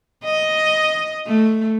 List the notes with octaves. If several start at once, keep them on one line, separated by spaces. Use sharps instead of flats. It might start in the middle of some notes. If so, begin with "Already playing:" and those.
D#5
A3